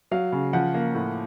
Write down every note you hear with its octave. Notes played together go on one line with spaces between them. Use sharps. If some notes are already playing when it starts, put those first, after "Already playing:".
F#3 F5
C#3
F3 F#5
A#3
A2